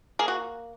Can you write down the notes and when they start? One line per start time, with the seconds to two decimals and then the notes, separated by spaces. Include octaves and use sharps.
0.19 A#3 G#4
0.28 F#4